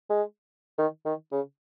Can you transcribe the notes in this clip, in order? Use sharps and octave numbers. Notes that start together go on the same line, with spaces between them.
G#3
D#3
D#3
C#3